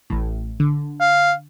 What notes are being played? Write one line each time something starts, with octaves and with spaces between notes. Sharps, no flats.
A1 A2
D3
F5